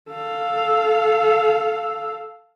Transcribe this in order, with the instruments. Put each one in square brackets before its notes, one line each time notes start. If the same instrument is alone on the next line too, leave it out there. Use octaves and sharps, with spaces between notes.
[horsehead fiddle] A4 F5